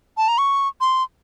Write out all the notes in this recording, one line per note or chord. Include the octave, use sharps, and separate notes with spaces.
A5
A#5
C#6
C6